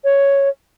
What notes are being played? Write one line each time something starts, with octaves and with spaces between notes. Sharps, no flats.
C#5